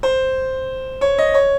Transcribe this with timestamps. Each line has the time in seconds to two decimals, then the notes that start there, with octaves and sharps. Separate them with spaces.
0.03 C5
1.01 C#5
1.18 D#5
1.34 C#5